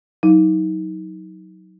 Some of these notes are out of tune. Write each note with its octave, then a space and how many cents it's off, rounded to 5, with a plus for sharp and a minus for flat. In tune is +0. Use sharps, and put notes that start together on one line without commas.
F#3 +0 D#4 +30